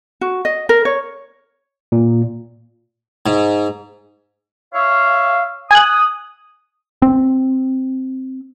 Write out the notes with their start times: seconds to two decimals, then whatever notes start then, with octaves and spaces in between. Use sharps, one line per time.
0.21 F#4
0.45 D#5
0.69 A#4
0.85 C#5
1.92 A#2
3.26 G#2
4.74 C#5 E5 F5
5.71 G#5 D#6 F#6
7.02 C4